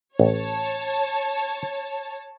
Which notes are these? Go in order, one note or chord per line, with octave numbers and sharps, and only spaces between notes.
A1 C#5 A5